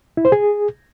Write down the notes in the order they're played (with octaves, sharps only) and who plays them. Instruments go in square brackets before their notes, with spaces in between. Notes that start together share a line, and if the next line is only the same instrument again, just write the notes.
[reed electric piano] E4
C5
G#4